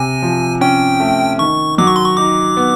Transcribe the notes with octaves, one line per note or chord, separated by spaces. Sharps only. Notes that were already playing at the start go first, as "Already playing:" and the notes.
Already playing: C3 G#5
F3
C#4 G5
A3
D#3 C#6
F#3 D6
C#6
C6
C#6
D#4 D6
B3